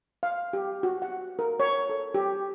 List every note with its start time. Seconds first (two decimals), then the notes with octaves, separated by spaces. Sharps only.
0.23 F5
0.53 G4
0.83 F#4
1.02 F#5
1.39 A#4
1.60 C#5
1.89 A4
2.15 G4